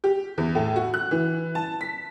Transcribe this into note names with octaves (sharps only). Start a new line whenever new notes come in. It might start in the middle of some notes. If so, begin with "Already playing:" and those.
G4
E2
A2
F#4
F#6
E3
A5
B6